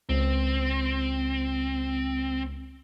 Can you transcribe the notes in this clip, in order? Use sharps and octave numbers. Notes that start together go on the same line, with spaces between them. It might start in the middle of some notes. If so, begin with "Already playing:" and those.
C#2 C4